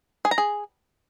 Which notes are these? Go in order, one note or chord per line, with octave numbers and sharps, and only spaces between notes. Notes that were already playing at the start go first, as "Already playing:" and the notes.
G#4
A#5
G#4